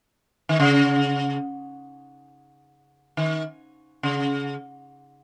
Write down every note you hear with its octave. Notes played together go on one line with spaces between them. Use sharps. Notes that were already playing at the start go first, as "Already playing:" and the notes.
D#3
C#3
D#3
C#3